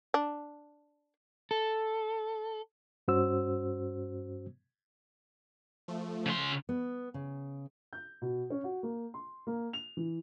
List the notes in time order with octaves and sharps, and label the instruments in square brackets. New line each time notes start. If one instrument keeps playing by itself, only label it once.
[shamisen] D4
[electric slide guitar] A4
[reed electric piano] G2 C#4 F#4 C5 E6
[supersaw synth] F3 A3
[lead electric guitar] C#3 C6
[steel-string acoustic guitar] B3
C#3
[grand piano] G6
B2
C#4
F#4
A#3
C6
A#3
F7
E3